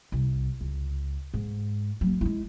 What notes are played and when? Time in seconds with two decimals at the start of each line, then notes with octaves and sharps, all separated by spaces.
0.12 C2
0.61 C#2
1.34 G#2
2.01 F#3 A#3
2.21 G#3 E4